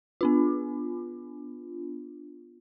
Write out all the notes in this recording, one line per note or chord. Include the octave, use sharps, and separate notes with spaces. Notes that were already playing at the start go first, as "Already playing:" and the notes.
B3 D4 F4